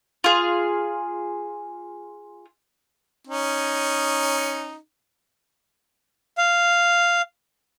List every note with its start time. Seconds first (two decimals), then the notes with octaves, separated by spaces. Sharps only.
0.24 F4 G#4
3.28 C#4 D#4
6.38 F5